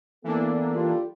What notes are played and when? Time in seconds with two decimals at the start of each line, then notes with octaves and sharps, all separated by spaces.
0.24 E3 A#3 B3 D4 A4
0.74 G3 F4